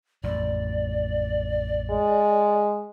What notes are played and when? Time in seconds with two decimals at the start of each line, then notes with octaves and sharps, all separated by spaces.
0.24 A1 F2 D5
1.90 G#3